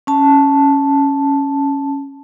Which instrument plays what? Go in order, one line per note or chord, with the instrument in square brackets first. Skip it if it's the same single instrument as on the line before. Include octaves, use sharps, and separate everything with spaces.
[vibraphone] C#4 A5